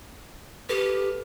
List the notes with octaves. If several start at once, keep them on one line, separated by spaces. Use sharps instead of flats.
G4 A4 B4